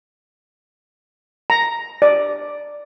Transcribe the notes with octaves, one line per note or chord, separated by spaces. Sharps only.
A#5
D5